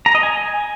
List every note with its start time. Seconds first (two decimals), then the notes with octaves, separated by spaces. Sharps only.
0.06 A#5
0.15 D#5
0.23 G#5